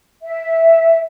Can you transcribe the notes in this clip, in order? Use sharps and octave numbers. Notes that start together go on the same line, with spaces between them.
E5